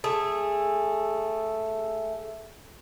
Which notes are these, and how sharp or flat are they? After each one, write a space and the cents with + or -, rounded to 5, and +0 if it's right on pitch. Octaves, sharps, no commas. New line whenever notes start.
A3 +0 G#4 -15